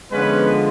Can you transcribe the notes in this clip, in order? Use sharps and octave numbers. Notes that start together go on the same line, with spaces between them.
D3 F3 G#3 B3 C#4 F4 B4